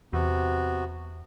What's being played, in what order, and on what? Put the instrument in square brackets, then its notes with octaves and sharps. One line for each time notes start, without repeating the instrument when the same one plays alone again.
[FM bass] E2 [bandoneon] C3 B3 F#4